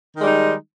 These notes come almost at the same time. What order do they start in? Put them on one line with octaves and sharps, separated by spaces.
D#3 G#3 G3 D#4